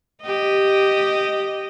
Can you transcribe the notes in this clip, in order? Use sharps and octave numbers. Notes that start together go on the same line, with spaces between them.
G4 D#5